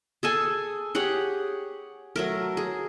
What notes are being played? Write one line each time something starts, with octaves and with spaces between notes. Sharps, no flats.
G#4 A4 G#5
G4 G#4 C#5 F#5
F#3 A3 A#4
G#4